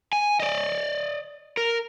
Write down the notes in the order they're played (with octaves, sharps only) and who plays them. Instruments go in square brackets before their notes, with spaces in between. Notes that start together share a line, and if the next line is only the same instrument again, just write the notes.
[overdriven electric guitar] G#5
D5 D#5
A#4